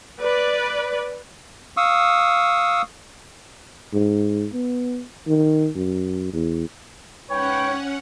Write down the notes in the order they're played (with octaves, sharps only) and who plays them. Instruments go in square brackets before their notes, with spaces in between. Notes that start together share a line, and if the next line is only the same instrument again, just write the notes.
[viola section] B4 D5
[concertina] F5 C#6 D#6 E6
[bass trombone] G#2
B3
D#3
F#2
E2
[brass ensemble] G#2 B4 G5 [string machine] C#4 F#5 [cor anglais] C#5